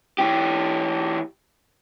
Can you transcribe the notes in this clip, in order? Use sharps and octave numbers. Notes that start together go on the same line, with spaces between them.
E3 G4